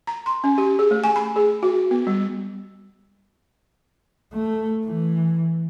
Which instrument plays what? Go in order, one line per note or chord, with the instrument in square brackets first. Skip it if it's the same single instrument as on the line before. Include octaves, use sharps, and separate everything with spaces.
[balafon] A#5
C6
C#4
G4
G#4
A3
G#5
B5
G#4
F#4
B3
G3
[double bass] A3
E3